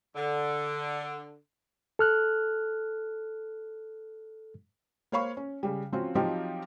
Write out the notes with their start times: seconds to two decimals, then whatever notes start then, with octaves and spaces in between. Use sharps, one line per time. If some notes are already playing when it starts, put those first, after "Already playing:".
0.16 D3
1.99 A4 F6 F#6
5.12 A#3 C5 C#5 F5 B5 C#6
5.37 C#4
5.63 C#3 G3
5.92 F3 C4 C#4 F4 F#4
6.15 F3 F#3 C4 D#4 F4 G4